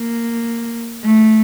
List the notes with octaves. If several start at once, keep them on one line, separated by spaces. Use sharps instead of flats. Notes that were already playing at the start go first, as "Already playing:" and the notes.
Already playing: A#3
A3